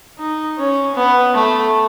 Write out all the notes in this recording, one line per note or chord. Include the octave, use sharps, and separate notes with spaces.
D#4
C#4
B3
A3